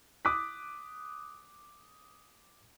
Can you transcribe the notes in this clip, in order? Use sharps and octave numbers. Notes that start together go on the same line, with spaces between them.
D6 D#6 F#6 B6